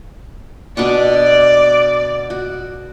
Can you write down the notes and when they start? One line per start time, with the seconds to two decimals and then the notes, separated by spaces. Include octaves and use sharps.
0.77 B2 D4 D5 C#6
2.30 F#4